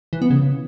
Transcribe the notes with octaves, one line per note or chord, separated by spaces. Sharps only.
E3
B3
C#3